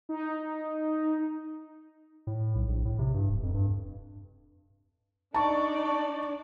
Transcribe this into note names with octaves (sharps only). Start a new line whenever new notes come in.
D#4
A2
B1
A#1
A2
C3
G2
D1
F2
G2
D4 D#4 D5 A5 C#6